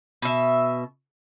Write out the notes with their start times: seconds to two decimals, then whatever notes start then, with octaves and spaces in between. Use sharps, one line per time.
0.22 B2 E5